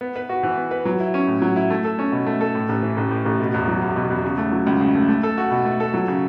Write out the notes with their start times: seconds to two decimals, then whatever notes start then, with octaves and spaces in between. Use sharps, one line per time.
0.01 B3
0.16 B4
0.29 F#4
0.43 E3
0.57 B3
0.71 B4
0.85 F#3
1.00 E4
1.14 C#4
1.27 A2
1.42 F#3
1.56 E4
1.70 A3
1.84 A4
1.99 C#4
2.12 B2
2.26 A3
2.41 A4
2.55 A2
2.69 A1
2.83 E3
2.97 A1
3.11 A2
3.25 A1
3.40 B2
3.54 E2
3.68 F#3
3.82 E2
3.96 B2
4.11 E2
4.24 C#3
4.38 A3
4.52 F#3
4.66 C#2
4.80 C#3
4.95 A3
5.09 A3
5.23 A4
5.38 F#4
5.51 B2
5.65 A3
5.80 A4
5.94 F#3
6.08 C#3